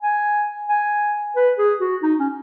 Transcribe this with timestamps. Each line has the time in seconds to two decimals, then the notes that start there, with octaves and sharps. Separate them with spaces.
0.02 G#5
0.69 G#5
1.36 B4
1.58 G#4
1.80 F#4
2.03 D#4
2.19 C#4